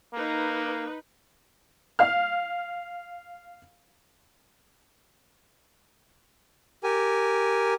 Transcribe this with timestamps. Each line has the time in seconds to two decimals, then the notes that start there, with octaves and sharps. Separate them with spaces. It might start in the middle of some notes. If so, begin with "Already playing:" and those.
0.13 A#3 D#4 B4
1.99 F5 F6
6.84 G4 A#4 G#5